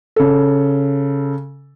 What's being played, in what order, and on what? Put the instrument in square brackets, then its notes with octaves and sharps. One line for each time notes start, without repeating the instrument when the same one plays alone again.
[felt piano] C#3 A4